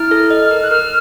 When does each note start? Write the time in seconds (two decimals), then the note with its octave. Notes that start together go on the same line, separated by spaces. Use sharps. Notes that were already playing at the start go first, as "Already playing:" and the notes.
Already playing: E4 F6
0.11 A4
0.31 D#5
0.51 A#4
0.63 F#6
0.71 A#4 F6